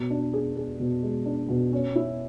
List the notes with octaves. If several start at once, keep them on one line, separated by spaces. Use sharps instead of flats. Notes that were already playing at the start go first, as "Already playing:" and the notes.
Already playing: B2
D4
G#4
G#4
B2
G#3
D4
B2
C#4
E4